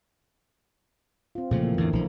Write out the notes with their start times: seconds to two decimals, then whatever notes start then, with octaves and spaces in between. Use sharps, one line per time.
1.35 C4 F4
1.51 A#2 C#3 F3 A3
1.63 E3 A#3
1.78 E2 A2 D3 E3 A#3
1.93 A#1 F3